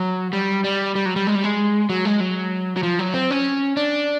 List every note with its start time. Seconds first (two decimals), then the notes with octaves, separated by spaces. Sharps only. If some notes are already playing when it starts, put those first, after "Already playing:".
Already playing: F#3
0.33 G3
0.64 G3
0.95 G3
1.06 F#3
1.16 G3
1.27 G#3
1.35 G3
1.44 G#3
1.90 F#3
2.05 G#3
2.20 F#3
2.77 F#3
2.83 F3
2.99 F#3
3.14 C4
3.31 C#4
3.77 D4